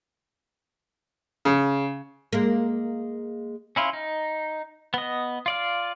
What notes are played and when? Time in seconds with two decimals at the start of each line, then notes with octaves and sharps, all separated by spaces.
1.45 C#3
2.33 G#3 A#3
3.76 C#4 E4 F4
3.93 D#4
4.94 B3 D#5
5.46 F4 D5 F5